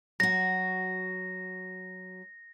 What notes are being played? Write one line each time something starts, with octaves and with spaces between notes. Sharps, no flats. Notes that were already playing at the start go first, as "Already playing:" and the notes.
F#3 F#4 A#6